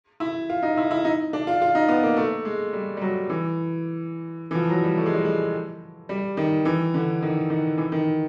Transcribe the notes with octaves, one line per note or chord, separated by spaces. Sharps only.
E4
F4
D#4
E4
E4
D#4
D4
F4
F4
D#4
B3
A#3
A3
G#3
G3
G3
F#3
E3
E3
F3
F#3
G3
A3
G#3
G3
G#3
G3
D#3
E3
D3
D#3
D#3
E3
D#3